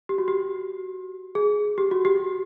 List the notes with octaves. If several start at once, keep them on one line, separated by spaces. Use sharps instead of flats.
G4
F#4
G4
G#4
G4
F#4
G4